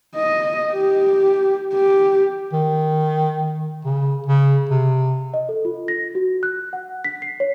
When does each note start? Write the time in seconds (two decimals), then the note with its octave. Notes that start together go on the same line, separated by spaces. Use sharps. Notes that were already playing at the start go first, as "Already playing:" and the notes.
0.16 D#5
0.72 G4
1.73 G4
2.53 D#3
3.85 C#3
4.26 C#3
4.69 C3
5.34 D#5
5.49 A4
5.65 F4
5.88 A#6
6.15 F#4
6.43 F#6
6.73 F#5
7.04 B6
7.22 C7
7.40 C#5